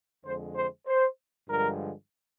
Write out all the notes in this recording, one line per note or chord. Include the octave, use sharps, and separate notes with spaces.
F2 D3 G#3 C5
C5
C5
G2 D3 F3 G#3 A#4